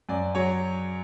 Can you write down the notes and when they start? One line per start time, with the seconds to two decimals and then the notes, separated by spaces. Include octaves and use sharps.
0.09 F#2 D5
0.35 F#3 C#5